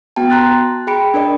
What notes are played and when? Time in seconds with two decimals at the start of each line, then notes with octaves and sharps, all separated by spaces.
0.16 B3 F#4 G5 A5
0.30 A#5 C6 F#6 A6
0.87 G#4 G5 B5 C#7 D7
1.14 D4 A#4 D5 D#5